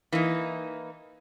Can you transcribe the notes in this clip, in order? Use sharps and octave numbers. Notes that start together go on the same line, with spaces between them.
E3 A#3 D#4